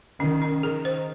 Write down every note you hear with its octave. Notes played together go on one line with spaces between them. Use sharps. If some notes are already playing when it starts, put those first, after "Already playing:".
D#3 C#4
C#4
D#3 G#4
C5